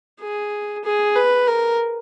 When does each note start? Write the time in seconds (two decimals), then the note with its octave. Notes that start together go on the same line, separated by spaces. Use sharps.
0.20 G#4
0.84 G#4
1.16 B4
1.47 A#4